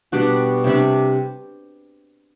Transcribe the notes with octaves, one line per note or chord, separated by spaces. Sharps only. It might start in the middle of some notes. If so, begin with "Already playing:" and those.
B2 G3 D4 F#4
C3 G3 D4